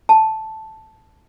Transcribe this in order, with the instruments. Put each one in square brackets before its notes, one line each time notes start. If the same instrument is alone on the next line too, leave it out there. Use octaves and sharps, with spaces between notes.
[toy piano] A5